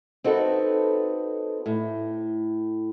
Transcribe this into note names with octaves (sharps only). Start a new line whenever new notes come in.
C4 D#4 F#4 A4 B4
A2